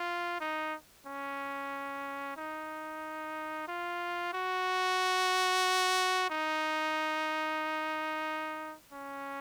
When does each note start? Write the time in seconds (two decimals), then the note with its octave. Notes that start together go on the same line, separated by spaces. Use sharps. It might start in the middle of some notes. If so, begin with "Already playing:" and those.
Already playing: F4
0.41 D#4
1.07 C#4
2.37 D#4
3.68 F4
4.33 F#4
6.30 D#4
8.92 C#4